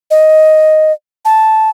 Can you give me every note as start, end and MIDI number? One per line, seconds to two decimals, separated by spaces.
0.11 0.92 75
1.25 1.70 81